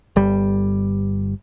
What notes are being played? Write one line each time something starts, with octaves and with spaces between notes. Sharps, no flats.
G1 G3